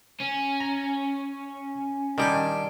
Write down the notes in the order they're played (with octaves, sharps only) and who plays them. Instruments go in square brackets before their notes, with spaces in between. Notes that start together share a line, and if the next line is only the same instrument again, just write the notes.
[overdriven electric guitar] C#4
[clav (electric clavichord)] A#5
[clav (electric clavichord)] D#3 G3 [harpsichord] D4 G5 G#5